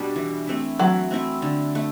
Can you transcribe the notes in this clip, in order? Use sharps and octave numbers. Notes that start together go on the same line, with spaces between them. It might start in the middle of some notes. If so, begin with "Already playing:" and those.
Already playing: B2 G3 D4
E3
A3 C4 E4
E3 F#3
A3 C4 E4
D3
A3